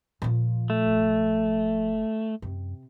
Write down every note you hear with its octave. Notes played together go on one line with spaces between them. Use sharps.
A#2 F3
A3
F1
F#2 C3